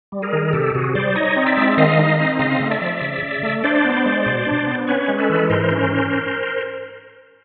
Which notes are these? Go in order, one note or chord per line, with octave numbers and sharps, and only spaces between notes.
G3
G#4 A#4
D#3
C3 G4 A4
C3 F#4 G#4
G3 C5 D5
D#4 C#5 D#5
C4
D5 E5
G#3
D#3 D#5 F5
D#4
C4
C#3 D#5 F5
A3
D5 E5
F3
C#3
C#3
A3
D4 C5 D5
B3
G#3
B2
D4
B3
C#4 B4 C#5
G#3
A4 B4
E3
G#2 A#4 C5
C#4